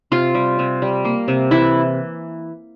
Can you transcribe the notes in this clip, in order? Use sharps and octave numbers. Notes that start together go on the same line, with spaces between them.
C3 F4
G3
C3
G3
A#3
C3
E3 E4